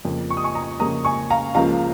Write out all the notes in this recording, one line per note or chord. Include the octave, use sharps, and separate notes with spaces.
F2 C#3 A#3
C#6
D#6
G#5 C#6
A#5 D#6
F2 C#3 A#3 A#5 D#6
G#5 C#6
F5 A#5
C#2 C#3 F3 A#3 F5 A#5